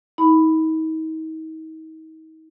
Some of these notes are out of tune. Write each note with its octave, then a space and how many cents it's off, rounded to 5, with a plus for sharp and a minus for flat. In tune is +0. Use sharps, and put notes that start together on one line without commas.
D#4 +40 B5 +5